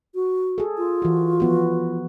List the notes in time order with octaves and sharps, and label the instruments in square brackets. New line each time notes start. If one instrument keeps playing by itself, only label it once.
[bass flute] F#4
[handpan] G#4 A4
[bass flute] F4
[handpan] E3 F#4
F3 B3 F#4